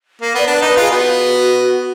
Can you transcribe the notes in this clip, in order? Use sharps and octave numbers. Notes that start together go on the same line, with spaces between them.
A#3
B3 D5
D4 B4
B4
D#4
B4
F4 G#4
B3 F#4